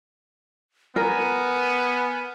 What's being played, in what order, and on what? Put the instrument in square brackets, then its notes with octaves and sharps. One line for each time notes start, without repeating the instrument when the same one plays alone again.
[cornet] B3 [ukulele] A#4 [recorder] G#5 [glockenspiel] F6